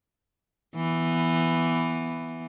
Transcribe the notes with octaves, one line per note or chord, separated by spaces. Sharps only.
E3 B3